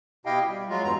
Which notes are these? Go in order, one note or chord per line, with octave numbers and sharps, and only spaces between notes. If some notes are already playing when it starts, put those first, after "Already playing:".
B2 E4 G4 D#5 F5 G5
G3
F#3 G#3 F4
E2 G2 E3 A#5